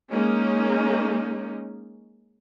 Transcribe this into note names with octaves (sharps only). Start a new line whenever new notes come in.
G#3 A#3 C#4 D#4